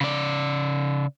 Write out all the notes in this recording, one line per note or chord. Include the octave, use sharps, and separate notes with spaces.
C#3 D5